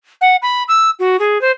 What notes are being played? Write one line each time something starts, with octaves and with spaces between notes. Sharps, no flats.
F#5
B5
E6
F#4
G#4
C5